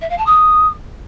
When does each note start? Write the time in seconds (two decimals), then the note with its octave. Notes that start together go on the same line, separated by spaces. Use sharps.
0.01 E5
0.10 F5
0.18 A5
0.26 D#6